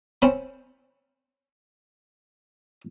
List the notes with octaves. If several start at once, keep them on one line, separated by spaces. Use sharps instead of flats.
C4 C#4 B5